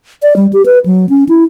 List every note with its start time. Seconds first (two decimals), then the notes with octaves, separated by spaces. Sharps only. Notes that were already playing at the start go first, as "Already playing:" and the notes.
0.23 D5
0.36 G3
0.53 G4
0.66 B4
0.86 F#3
1.09 C#4
1.29 E4